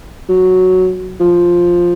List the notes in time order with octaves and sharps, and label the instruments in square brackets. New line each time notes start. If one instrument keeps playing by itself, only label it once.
[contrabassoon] F#3
F3